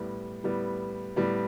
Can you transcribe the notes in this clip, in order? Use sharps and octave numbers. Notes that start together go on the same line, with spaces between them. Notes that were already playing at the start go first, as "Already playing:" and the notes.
Already playing: A2 G3 B3
A2 G3 B3
A2 G3 B3